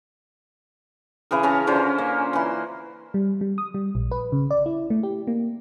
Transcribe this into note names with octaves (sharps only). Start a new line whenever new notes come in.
C#3 E3 G#4 A#4
C#4 A#4 A5 A#5
D3 C#4 F4 C5
A#3
E3 C6
G3
G3
D#6
G3
A#1
B4
C#3
D5
E4
A3
G4
A#3